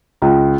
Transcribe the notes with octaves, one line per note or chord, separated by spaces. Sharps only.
C#2